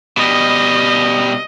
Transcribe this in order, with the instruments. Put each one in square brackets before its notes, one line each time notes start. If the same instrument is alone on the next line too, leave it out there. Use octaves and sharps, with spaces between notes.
[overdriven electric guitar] B2 G3 [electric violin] D#5